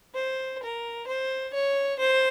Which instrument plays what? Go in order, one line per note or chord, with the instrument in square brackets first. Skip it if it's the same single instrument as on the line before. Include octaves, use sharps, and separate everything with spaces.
[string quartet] C5
A#4
C5
C#5
C5